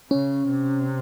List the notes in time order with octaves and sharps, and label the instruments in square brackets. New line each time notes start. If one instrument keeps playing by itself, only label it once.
[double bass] C#3 [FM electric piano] C#4
[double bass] C3